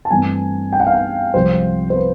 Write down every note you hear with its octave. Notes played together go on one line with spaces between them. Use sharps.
A5
G2 E3 A3 C4 G#5
G5
F#5
F5
F#5
C2 C3 F3 G#3 C5
C5
B4